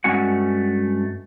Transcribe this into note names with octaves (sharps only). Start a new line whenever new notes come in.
G2 G#3 A3 C#4 F#4 F#5